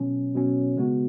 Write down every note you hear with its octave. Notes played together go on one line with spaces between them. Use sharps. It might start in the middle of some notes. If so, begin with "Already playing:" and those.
Already playing: B2 F#3 C#4
B2 F#3 C#4
C#3 G#3 B3 F#4